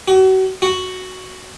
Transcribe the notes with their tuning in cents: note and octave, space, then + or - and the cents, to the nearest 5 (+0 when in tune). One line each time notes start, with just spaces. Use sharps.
F#4 +35
F#4 +0